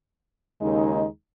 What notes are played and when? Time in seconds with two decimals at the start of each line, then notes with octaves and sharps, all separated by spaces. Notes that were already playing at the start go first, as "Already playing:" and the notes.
0.61 D#2 C#3 G#3 D#4